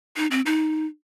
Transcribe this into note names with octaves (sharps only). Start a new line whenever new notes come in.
D#4
C4
D#4